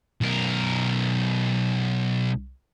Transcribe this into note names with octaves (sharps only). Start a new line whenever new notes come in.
B1 A#4